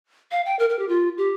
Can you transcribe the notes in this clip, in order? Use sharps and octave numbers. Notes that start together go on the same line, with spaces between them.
F5
G5
A#4
A#4
G4
F4
G4